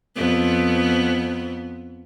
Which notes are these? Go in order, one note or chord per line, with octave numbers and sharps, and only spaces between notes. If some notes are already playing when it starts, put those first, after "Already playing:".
F2 B3